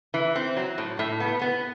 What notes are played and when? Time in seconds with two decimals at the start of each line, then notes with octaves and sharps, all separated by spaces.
0.14 E3
0.36 C4
0.57 F#3
0.78 A2
0.99 A2
1.20 B3
1.41 B3